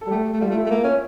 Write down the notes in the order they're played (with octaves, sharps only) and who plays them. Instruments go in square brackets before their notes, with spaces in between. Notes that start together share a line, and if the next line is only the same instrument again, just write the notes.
[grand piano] A4
[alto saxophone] G3
[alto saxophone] A3 [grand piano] G4
[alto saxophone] A3
[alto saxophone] G3 [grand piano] F4
[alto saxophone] A3
[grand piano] E4
[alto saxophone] A3
A#3
C#4